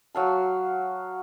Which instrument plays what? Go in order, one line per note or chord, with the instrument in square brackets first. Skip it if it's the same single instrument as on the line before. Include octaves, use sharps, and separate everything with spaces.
[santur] F#3 F5 A5